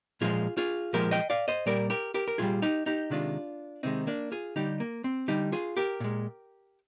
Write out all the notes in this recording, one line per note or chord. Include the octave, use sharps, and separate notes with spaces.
A#2 F3 G#3 F4 G#4
F4 G#4
A#2 F3 G#3 G4 A#4
D#5 G5
D5 F5
C5 D#5
A#2 G3 A#4 D5
G4 A#4
G4 A#4
A#4
A#2 G3 F4 G#4
D#4 G4
D#4 G4
C3 D#3 G#3 D4 F4
C3 D#3 G#3 C4 D#4
A#3 D4
F4 G#4
D3 G3 D#4 G4
A#3
C4
D3 G3 D#4 G4
F4 G#4
G4 A#4
A#2 G#3